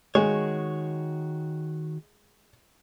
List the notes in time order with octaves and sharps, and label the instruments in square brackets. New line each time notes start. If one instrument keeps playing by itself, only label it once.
[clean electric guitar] D#3 F#4 C#5 [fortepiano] G#3